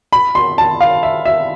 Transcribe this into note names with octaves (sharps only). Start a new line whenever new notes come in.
B5
C6
A5
F5
E5
E5